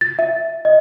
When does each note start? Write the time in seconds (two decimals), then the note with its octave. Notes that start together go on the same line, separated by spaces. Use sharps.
0.01 A6
0.19 E5
0.65 D#5